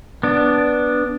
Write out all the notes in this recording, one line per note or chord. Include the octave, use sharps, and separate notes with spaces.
B3 D4